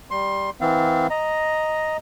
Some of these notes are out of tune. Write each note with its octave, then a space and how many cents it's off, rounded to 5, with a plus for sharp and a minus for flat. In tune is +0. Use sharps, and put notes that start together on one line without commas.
G3 +0 C6 +20
E3 -25 C4 -35 F5 -30
D#5 +0 A#5 +0